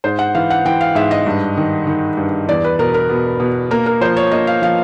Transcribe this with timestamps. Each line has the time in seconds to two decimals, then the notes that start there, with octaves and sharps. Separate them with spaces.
0.04 G#2 C5
0.19 F#5
0.35 E3 F5
0.50 F#5
0.65 E3 G5
0.81 F5
0.95 G#2 E5
1.11 D#5
1.26 G2
1.57 D#3
1.87 D#3
2.17 G2
2.48 E2 D5
2.64 B4
2.79 B2 A#4
2.94 A#4
3.10 B2
3.40 B2
3.71 A#3 A#4
3.86 A#4
4.01 F3 C5
4.17 C#5
4.31 A#3 D#5
4.47 F5
4.62 F3 F5